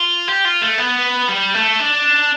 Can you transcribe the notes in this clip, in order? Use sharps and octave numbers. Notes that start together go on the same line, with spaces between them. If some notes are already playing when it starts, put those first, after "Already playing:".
Already playing: F4
G4
F4
A3
B3
G3
A3
D4